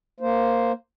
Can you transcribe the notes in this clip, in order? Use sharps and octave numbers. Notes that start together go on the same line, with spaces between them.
A#3 C5